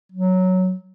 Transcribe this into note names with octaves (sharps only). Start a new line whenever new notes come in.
F#3